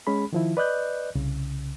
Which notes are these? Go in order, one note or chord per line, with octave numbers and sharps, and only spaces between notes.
G#3 C#4 G#4 B5
D#3 F3 E4
B4 D5 D#5 F#6 G6
C2 C#3